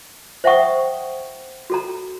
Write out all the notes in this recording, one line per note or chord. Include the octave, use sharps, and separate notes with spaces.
C5 E5 F#5 G5 C#6 D#6
F#4 A4 A#5